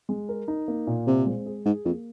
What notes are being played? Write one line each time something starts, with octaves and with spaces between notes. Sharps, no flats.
G#3
A#4
D#4
A#3
A#2
C3 C4
G#3
G#4
G#2 G#4
F2 A#3